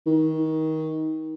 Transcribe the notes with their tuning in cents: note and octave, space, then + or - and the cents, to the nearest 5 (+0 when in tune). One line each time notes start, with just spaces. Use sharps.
D#3 +25